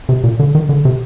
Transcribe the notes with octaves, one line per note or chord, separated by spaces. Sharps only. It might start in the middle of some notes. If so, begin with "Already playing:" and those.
C3
A#2
D3
D#3
D3
C3